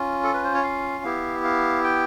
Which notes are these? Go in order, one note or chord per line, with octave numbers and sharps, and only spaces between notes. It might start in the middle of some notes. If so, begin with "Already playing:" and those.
Already playing: C#4 F4
A4
B4
C5
C#5
F5
B3 E4 G4
F5
G5